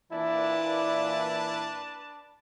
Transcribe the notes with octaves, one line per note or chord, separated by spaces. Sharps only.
A#2 E3 D4 E4 B4 D5 A5